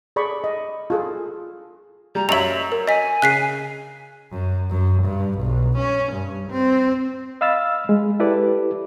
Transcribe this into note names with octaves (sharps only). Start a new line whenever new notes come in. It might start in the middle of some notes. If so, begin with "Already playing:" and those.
G#4 A4 D5 B5 C#6
D#5
F4 G#4 A4
G3 A#5
F#2 C#5 D#5 E5 F7 F#7
A#4
D#5 G#5 B6
C#3 F#6 B6 C7
F#2
F#2
G2
B1
C#4
G2
C4
D#5 F5 B5 E6 F6 A6
G#3
E4 G4 A4 B4 D5